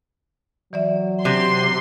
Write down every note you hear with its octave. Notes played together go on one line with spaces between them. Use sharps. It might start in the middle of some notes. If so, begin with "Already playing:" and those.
E3 F#3 D5 E5
C3 C6 F#6